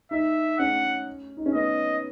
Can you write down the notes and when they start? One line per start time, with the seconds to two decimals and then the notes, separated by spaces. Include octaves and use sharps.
0.11 D#4 E5
0.58 C#4 F#5
1.37 D#4
1.46 C#4
1.54 B3 D#5